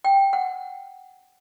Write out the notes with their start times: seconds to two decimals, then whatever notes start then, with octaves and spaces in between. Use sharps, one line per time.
0.05 G5
0.33 F#5